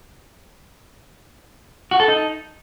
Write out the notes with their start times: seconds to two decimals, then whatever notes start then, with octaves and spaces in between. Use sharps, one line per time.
1.91 F#4
2.00 A4
2.08 D#4